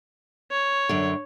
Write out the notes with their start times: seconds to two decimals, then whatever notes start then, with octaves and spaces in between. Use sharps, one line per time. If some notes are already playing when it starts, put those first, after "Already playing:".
0.51 C#5
0.89 F#2 D3